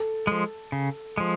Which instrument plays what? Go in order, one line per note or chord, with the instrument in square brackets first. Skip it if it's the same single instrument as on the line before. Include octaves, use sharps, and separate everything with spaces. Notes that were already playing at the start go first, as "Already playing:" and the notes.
Already playing: [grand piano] A4
[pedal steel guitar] F3 G#3
C#3
F3 G#3